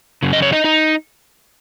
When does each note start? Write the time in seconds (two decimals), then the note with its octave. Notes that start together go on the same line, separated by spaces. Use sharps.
0.23 F#2 C#3
0.33 D#5
0.42 C#5
0.52 D#4 D#5
0.64 D#4 D#5